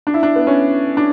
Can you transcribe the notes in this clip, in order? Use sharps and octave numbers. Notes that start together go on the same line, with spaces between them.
D4
E4
D4
B3
C#4
D4